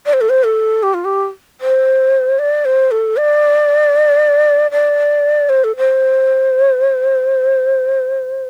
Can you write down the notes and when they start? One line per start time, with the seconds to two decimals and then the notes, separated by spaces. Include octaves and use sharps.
0.06 D5
0.13 C5
0.21 A4
0.29 C5
0.45 A4
0.83 G4
0.94 F4
1.05 G4
1.61 C5
2.39 D5
2.65 C5
2.91 A4
3.17 D5
4.71 D5
5.49 C5
5.64 A4
5.77 C5